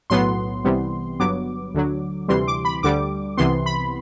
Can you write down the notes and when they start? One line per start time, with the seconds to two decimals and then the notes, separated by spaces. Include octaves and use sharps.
0.10 B1 A2 F#3 B3 C6
0.65 C2 C3 E3 G3 B3
1.19 G1 G2 F#3 B3 D6
1.74 D2 D3 F#3
2.28 D2 C3 E3 G3 C6
2.48 D6
2.65 B5
2.83 D2 D3 G3 D6
3.37 C2 C3 E3 B3 C6
3.66 B5